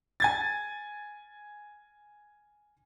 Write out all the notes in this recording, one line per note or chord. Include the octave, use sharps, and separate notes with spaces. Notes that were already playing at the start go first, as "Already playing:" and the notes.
G#5 G#6 A6